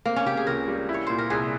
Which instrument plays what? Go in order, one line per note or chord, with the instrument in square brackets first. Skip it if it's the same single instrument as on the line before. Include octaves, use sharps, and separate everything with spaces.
[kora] A#3 [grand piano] C4
[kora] C#4
[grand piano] C#3 [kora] G4
[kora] G#4
[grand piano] C#2 [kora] A#4
[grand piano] G3
E4
[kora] C#5
[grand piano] A#2 [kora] C5
[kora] A#4
[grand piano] C2 [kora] G#4